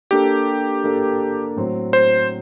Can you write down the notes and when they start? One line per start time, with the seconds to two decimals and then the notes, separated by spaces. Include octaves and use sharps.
0.11 A#3 D4 G4 A4
0.84 A#3 D4 A4
1.56 A2 F#3 C4
1.93 C5